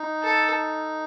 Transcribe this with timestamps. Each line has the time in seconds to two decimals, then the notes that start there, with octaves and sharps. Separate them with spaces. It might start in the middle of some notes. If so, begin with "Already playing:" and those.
Already playing: D#4
0.23 A4